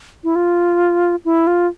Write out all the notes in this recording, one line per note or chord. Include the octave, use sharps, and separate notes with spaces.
E4
F4
E4
F4